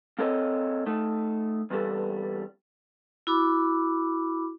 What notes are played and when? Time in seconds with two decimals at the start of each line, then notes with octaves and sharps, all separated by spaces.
0.19 A#3 C4 A4 C#5 D#5
0.86 A3 D#4
1.70 E2 G2 G3 A4
3.27 E4 F#4 B5 D6